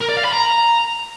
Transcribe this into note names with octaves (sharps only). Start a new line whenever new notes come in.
A#4
D5
F5
B5
A#5